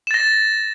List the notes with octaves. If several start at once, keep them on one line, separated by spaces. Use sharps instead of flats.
A6 A#6 E7